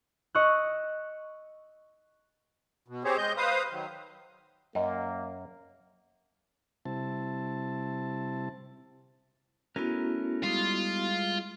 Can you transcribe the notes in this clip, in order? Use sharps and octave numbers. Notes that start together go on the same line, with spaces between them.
D#5 C#6 E6 F#6
B2
C4 G4 G#4 C5 C#5
G#3 D#5 G6
B4 C5 F5 D#6
D#3 F#3
F#2 A#3 D#5
C3 G3 C4 E4 A5
A3 B3 C#4 E4 F#4 A#4
G3 G#3 F4